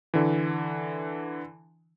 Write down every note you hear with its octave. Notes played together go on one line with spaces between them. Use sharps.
D3 E3